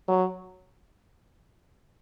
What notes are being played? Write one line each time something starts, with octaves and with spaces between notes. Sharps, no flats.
F#3